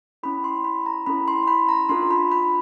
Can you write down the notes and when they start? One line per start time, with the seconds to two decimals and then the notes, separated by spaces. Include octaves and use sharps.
0.23 C#4 E4 A4 B5
0.44 C6
0.64 B5
0.86 A#5
1.06 C#4 E4 A4 B5
1.28 C6
1.43 C6
1.48 B5
1.69 A#5
1.89 D4 F4 A4 C6
2.11 B5
2.32 B5